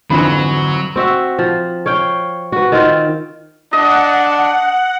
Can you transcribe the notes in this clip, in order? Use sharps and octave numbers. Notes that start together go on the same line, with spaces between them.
F2 G#2 D3 E3 F#3 B5
C4 F#4 E5
F3
C#5 F5 G5
F#4 B4
D#3 C4 F4
D4 D#5 F#5